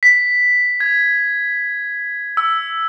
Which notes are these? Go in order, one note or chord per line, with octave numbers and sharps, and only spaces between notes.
B6
G#6
E6